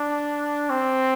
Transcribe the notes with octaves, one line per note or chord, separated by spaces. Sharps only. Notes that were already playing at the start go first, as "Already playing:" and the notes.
Already playing: D4
C4